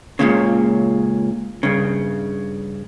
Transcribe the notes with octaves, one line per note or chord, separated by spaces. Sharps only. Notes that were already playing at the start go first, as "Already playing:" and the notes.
C#2 F#2 A#2 C#3
G2 C#3